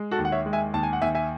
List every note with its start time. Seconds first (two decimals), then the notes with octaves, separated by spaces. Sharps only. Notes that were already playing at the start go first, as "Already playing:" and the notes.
Already playing: G#3
0.11 F#4 A4
0.18 D#2
0.25 F#5
0.32 C#5 E5
0.46 G#3
0.53 E5 G#5
0.74 D#2 A5
0.83 G#5
0.93 F#5
1.01 D#2 E5 G#5
1.15 E5 G#5